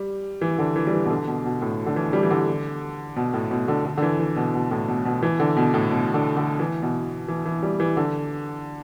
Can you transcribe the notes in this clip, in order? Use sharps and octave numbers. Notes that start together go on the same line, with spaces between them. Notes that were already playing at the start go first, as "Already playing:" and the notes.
Already playing: G3
E3
D3
E3
G3
E3
B2
D3
B2
B2
A2
D3
E3
G3
E3
D3
B2
A2
B2
D3
D3
D3
E3
E3
B2
B2
A2
B2
B2
E3
D3
B2
A2
B2
D3
D3
E3
B2
E3
E3
G3
E3
D3